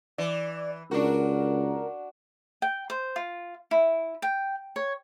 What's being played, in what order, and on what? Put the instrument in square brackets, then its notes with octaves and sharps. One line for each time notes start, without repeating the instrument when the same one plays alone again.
[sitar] E3 [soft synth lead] D5
[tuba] C#2 [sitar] D4 F#4 [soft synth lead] A#4
[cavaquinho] G5
C5
F4
E4
G5
C#5